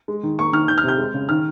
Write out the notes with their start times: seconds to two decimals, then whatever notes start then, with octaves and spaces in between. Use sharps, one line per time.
0.08 G#3
0.23 D#3
0.39 A#3 C#6
0.53 D#3 F6
0.68 D#3 G6
0.78 F6
0.83 C3
0.88 G6
0.98 G#3
1.14 C#3
1.29 D#3 F6